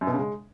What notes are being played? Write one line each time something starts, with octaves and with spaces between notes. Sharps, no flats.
F#2
B2
C#3
G#3